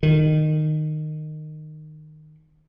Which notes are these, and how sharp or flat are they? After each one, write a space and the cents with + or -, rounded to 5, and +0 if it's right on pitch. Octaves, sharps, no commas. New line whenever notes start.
D#3 -15